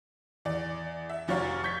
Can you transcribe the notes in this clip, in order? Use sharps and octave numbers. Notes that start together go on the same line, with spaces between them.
E2 D5
E5
F1 F3 F#4 C#5 F5 A#5
C#6 G6 G#6 B6